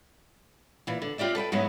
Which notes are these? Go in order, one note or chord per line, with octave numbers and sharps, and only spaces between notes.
A#2 E3
D3
C4 F4 G4 D5 E5
A4 B4 E5 G5
G#2 F#3 G#3 B3 C#4 E4